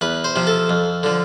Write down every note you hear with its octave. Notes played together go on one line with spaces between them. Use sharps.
E2 B4
C5
C3 F3
A4
F2
D3 F3